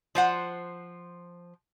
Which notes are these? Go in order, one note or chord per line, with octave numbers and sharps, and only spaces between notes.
F3 C5 F#5